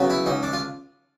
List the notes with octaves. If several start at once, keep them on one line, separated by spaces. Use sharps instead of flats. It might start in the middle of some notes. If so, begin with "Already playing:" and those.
Already playing: C#3 F#3 B3
E4
C#2 D#4
D4
F4